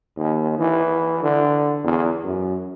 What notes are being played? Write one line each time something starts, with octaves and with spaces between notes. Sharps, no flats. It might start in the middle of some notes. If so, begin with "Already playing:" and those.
D#2
E3
D3
E2
F#2